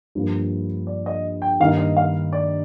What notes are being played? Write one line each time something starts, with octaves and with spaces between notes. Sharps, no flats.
G2 F3 A#3
D5
D#5
G5
G2 D#3 A#3 D#4 F5
D#5
F5
D5